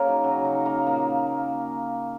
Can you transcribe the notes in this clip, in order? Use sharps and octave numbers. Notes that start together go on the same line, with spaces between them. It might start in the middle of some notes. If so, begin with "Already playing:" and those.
Already playing: A#3 C#4 G#4 A#4 C#5
F#3 D#4
C#3 F#3 F#4
C#3
D#4
F#3
A#3 A#4
F#3
A#2 A#3 A#4